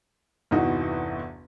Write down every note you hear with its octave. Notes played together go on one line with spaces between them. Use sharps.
G1 E2 C3 E3 D#4 F#4